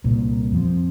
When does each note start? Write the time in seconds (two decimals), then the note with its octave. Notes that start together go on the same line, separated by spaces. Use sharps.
0.04 C2 A#2 A#3
0.52 F2 F3 C4